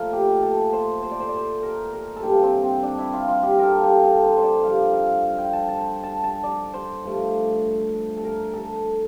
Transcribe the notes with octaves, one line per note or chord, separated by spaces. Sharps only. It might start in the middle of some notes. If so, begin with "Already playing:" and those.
Already playing: A#2 F3 A3 A#4
G4
A4
C5
C5
D5
C5
D5
C5
A#4
A#4
A4
G2 E3 A#3 G4
C4
C4
D4
E4
F4
F4
G4
A4 A#4
G4
A4
C5
C5
D5
G2 F3 A#3 F5
F5
F5
G5
A5
A5
A5
A5
D5
C5
G2 F3 A3
A4
A#4
A4